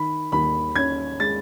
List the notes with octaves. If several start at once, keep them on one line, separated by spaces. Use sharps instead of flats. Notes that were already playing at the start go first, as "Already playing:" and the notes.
Already playing: D#3 B5
D#2 B5
C#4 G#6
G#3 A6